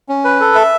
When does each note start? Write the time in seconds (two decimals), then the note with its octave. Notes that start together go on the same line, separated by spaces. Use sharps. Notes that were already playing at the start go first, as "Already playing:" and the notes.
0.09 C#4
0.25 B4
0.40 A4
0.55 E5